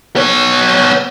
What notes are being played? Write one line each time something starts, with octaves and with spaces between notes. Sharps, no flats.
B3 C#5